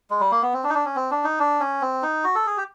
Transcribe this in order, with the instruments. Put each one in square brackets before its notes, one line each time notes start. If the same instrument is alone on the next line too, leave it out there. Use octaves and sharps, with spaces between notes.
[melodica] G#3
G3
A#3
B3
C4
D4
D#4
D4
C#4
C4
D4
D#4
D4
C#4
C4
D#4
F#4
A4
G#4
G4